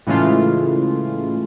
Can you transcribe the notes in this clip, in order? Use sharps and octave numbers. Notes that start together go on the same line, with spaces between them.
A2 C#3 E3 G#3 A3 F4